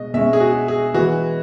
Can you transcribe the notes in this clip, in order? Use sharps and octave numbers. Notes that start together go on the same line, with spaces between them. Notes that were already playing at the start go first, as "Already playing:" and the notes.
Already playing: B2 G#3 D#5
B2 G#3 C#4 E5
G#4
F#4
G#4
E3 G#3 B3 F#4